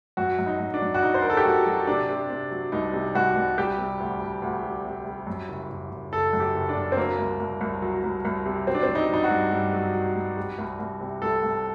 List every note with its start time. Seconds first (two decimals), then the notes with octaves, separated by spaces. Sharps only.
0.17 F#2 F#4
0.39 F#2
0.46 D#4
0.60 F#2
0.74 D4
0.82 F#2
0.94 F#4
1.02 F#3 D#4
1.14 C5
1.22 F#3 A#4
1.30 A4
1.37 G4
1.44 F#3 F#4
1.66 F#3
1.87 C3 D4
2.09 C3
2.30 C3
2.51 F#3
2.72 C2 D#4
2.93 C3
3.15 C2 F#4
3.36 C2
3.58 G3 G4
3.78 C3
4.00 D2
4.21 D2
4.42 D2
4.63 G3
4.85 C3
5.06 G3
5.27 F#2
5.48 F#1
5.69 F#1
5.91 F#1
6.12 F#1 A4
6.33 F#2
6.40 G4
6.55 F#1
6.69 D4
6.76 F#1
6.92 C4
6.97 F#3 A#3
7.19 C2
7.40 C2
7.61 C2
7.82 F#3
8.04 C2
8.25 C2
8.46 C3
8.67 F#3 C4
8.75 D4
8.83 C4
8.88 F#3
8.95 D#4
9.09 F#3 D#4
9.24 F#4
9.31 G2
9.52 G2
9.73 F#3
9.95 F#3
10.16 G2
10.37 G3
10.58 C2
10.79 C2
11.00 C3
11.22 C2 A4
11.43 C2